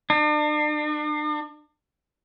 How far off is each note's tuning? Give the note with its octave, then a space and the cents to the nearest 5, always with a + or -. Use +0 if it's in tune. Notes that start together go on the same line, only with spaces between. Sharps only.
D4 +40